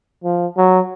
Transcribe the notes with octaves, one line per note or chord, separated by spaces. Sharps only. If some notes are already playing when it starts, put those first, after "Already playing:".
F3
F#3